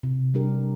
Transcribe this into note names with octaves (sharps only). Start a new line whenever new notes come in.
C3
G3 D4 G4 A#4